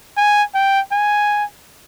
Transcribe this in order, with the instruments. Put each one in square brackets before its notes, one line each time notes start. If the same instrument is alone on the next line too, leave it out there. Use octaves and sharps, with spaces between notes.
[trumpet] G#5
G5
G#5